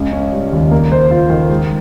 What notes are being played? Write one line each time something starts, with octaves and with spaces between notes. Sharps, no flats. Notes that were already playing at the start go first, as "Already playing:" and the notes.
Already playing: C#2 C#3
C#4
G3
D#2
A#3
C5
F4
D#3
G#3